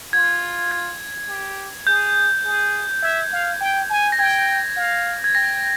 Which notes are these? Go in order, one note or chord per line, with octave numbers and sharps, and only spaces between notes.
F4 G#6
G#6
G4
G#4 G6
G#4
E5 G#6
F5
G5
G#5
A#6
G5 G#6
F5
G#6
G5 A#6